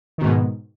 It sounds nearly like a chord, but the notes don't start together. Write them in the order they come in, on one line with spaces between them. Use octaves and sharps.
D#3 B2 G#2